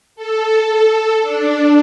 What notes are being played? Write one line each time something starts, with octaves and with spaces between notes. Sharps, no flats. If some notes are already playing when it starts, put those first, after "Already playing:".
A4
D4